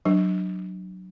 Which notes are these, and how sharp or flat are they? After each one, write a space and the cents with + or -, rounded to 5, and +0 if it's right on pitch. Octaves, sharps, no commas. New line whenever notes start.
F#3 +0 D4 +25